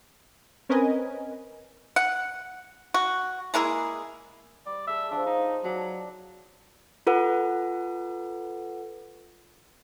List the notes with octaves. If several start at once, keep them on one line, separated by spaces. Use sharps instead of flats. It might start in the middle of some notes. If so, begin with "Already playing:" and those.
C4 C#4 A#4 B4 D#5 G#5
F#5
F#4
G#3 A#3 E4 G#4
G3 D5
G#4 A4 E5
F3 D4 C6
D#4
F#3 D4
F4 A4 B4 F#5